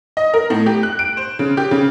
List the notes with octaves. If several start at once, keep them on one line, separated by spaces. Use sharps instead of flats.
D#5
A#4
A2
G4
F#6
D7
C5
C#3
G4
C#3